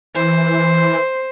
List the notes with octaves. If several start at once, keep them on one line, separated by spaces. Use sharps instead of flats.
E3 C5